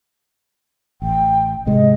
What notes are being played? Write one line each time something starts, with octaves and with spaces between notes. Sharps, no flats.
A1 G5
G#2 C3 G#3 D#5